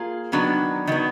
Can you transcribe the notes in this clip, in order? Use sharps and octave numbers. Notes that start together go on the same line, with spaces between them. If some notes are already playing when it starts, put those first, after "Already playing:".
Already playing: A#3 F4 G#4
D#3 F#3 B3 D4
D#3 F#3 B3